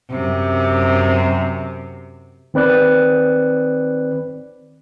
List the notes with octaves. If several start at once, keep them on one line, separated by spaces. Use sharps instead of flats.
F#2 C3
D#3 C4 B4 D5 F#6